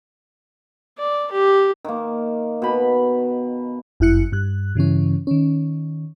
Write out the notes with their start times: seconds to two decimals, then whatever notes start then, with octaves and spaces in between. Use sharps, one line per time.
0.98 D5
1.32 G4
1.85 D#3 A#3
2.62 B2 B5
4.00 G1 F#2 E4 F#6 C#7
4.32 G2 F#6
4.75 G2 C#3 E3 C#4
5.27 D#3 C#4